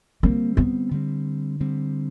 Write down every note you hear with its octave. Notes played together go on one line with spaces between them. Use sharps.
D3 G3 A#3 C4
B3
D3 G3 C4
D3 G3 C4